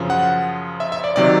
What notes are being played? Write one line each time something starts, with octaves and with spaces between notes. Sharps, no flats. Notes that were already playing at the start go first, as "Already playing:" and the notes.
Already playing: F#2 C#3 F3
F#5
E5
E5
D5
C3 D#3 F#3 D5